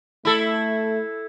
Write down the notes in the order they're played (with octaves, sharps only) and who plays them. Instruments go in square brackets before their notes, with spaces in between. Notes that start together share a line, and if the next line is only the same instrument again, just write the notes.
[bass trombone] A3 [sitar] E4 A4